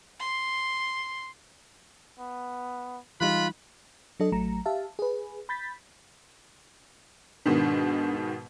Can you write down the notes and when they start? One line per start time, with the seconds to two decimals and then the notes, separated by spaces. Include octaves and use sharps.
0.20 C6
2.20 B3
3.21 E3 G3 G#3 D#4 F4 B5 F#6
4.20 F#3 D4 A4 D#5
4.32 A1 F#3 A3 A#5
4.66 G4 E5 F5 A5
4.99 G#4 B4
5.49 B5 G6 A6 B6
7.46 G#2 B2 D#3 D4